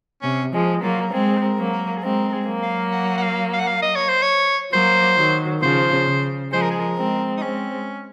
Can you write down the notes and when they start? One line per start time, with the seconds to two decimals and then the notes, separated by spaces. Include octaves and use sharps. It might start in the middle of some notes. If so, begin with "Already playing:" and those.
0.22 C3 C#4
0.53 F3 G#3
0.82 F#3 A#3 F4
1.01 A#4
1.13 G#3 C4 G#4
1.37 C5
1.42 A#4
1.58 F#3 A#3
1.72 A#4
1.97 G#4
2.03 G#3 C4 A#4
2.29 A#4
2.33 G#4
2.47 F#3 A#3
2.63 F5
2.92 F#5
3.18 F#5
3.23 F5
3.53 F5
3.59 F#5
3.67 F5
3.82 D#5
3.96 C#5
4.09 C5
4.22 C#5
4.72 F#3 A#3 C5
5.17 D#3 F#3
5.62 C#3 F3 C5
6.07 C#3
6.52 F3 G#3 C5
6.62 A#4
6.71 G#4
6.80 A#4
6.97 G#3 C4
7.37 D#4
7.42 G#3 C4 C#4